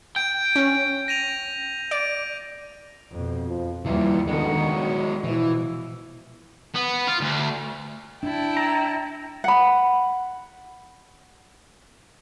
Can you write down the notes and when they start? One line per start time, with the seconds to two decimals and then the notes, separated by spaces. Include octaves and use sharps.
0.16 G5 G6
0.56 C#4
1.08 A#6 D#7 F7
1.91 D5 D7
3.12 F2 B2
3.48 F3
3.86 D#2 E3 F3 G3 E4
4.28 D3 D#3 G#3 B3 F#4
4.74 F#3
5.24 B2 E3 F3 E4
6.75 B3
7.08 F4
7.21 D2
8.23 D4 E4 G5 A5
8.57 A#5
9.44 F#5 B5